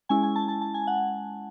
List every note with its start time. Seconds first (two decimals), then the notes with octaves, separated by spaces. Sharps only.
0.09 G#3 C#4 E4 G#5
0.23 G#5
0.36 A5
0.48 A5
0.61 A5
0.74 G#5
0.87 F#5